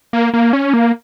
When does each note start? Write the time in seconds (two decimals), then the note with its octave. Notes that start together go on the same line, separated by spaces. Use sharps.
0.13 A#3
0.34 A#3
0.53 C#4
0.74 A#3